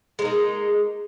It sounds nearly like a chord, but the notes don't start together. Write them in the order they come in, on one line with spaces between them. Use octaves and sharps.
G#3 D#4 A#3